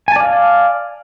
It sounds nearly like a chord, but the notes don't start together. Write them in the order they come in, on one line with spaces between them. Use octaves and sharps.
G#5 A5 D5 F5